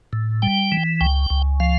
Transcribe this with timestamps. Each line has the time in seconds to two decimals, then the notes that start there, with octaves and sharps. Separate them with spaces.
0.13 A2
0.42 G3 G5
0.72 E3
1.01 C#2 G5
1.30 C#2
1.60 F3 F5